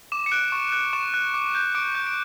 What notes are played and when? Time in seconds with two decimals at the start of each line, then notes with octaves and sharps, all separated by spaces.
0.12 D6 E7
0.26 C#7
0.32 F#6 D7
0.52 C#6
0.72 F#6
0.93 C#6 E7
1.14 F#6
1.34 D6
1.55 G6
1.75 D6 D7
1.95 G6
2.07 D7